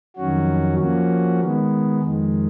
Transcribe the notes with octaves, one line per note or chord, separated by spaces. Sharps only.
F2 D#3 F#3 C#4 F#4
F3 A#3 C#4 F#4
D#3 G#3 B3
F2 D#3 G#3